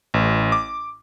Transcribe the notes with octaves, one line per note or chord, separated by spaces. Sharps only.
A1
D6